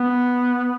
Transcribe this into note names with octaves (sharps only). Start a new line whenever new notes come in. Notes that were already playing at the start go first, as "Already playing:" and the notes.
Already playing: B3